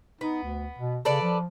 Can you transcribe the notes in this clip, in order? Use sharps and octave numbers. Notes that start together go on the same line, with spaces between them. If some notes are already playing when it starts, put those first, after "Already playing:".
B3 D#4
D2
B2
C#3 A4 B4 D5
F3